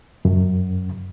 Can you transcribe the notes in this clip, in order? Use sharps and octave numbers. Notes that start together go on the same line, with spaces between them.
F#2